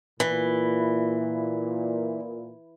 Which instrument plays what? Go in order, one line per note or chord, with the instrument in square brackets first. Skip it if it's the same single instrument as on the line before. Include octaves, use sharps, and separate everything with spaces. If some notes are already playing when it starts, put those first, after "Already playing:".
[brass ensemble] A#2 [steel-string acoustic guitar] E3